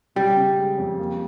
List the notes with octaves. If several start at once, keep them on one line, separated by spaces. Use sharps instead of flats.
C#3 G3
C#3
G#3
F2
A#3